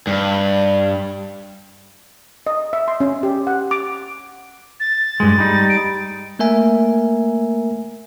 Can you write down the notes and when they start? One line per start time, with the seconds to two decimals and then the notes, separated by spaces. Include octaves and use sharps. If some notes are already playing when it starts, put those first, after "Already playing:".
0.07 G2
2.47 D#5
2.73 E5
2.88 C6
3.00 C#4
3.23 G4
3.47 F#5
3.71 D6
4.80 A6
5.20 G2 G#3
5.38 G3 D#4
5.69 D7
6.39 A3 A#3 A#4 E5 G#5